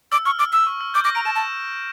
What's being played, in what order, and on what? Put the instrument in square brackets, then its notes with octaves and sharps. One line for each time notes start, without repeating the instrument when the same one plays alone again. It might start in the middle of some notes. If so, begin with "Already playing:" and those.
[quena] D6 [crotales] E6
[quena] C#6 [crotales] F6
[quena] D6 [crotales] E6
[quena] E6
[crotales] C#6
E6
[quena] D6 [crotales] G6
[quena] D6 [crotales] A#6
[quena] A#5 [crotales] D7
[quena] A5 [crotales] E7
[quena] A5